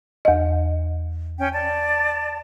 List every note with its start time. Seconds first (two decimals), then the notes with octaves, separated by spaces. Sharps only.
0.25 E2 D#5
1.38 C#4 G5
1.53 D5 A5